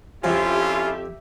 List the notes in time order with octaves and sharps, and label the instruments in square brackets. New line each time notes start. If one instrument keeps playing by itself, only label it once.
[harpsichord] F2 [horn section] C#4 E4 F4 [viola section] G4 E5